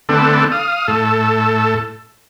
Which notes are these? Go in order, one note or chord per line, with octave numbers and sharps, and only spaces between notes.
D3 A3 B3 C4 D4 A4
F5 D#6
A2 A4